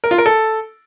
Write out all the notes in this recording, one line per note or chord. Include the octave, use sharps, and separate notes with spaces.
A#4
F4
A#4
A4